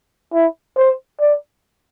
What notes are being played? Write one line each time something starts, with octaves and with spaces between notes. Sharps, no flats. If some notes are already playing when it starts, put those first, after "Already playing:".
E4
C5
D5